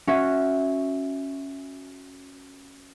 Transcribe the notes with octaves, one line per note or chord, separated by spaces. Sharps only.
C#4 F#4 E5